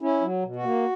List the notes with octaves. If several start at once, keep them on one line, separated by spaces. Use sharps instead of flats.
C#4 E4
F#3
B2
F#4
A#3